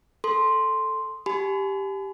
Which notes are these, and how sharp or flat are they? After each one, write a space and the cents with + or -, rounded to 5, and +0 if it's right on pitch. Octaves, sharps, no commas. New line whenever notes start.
A4 +0 C6 +0
G4 +0 G#5 +40 B5 +45